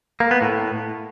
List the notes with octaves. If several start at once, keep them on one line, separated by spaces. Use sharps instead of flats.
A#3
B3
A2